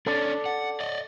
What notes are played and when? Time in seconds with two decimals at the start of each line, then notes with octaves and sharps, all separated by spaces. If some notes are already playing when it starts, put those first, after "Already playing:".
0.06 C#4 D4 A4 D5
0.46 F#5
0.80 D5 D#5